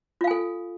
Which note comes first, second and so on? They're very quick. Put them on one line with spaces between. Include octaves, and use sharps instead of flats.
F4 F5 G#5 A4